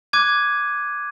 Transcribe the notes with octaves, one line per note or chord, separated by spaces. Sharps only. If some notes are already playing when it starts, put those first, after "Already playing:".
D6 F#6 G#6 D#7